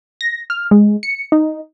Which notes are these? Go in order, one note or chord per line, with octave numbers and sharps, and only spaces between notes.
A#6
F6
G#3
C#7
D#4